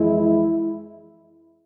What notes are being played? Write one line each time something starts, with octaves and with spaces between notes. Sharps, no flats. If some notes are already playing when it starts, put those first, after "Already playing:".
Already playing: F2 E3 G#3 E4